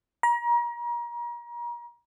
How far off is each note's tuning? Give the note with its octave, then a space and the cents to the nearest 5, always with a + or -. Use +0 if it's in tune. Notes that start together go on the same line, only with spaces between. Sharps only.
A#5 +35